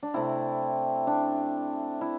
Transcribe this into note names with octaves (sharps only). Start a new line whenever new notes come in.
D4
C3 A3 C4 E4
D4
E4